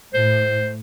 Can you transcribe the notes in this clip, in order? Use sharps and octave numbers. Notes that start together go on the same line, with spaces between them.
A2 C5